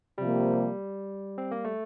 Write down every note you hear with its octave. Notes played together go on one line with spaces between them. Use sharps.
C3 F3 G3 A#3
C4
A#3
A3